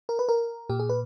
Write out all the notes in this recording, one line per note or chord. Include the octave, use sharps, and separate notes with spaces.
A#4
B4
A#4
A#2 G4
G#4
B4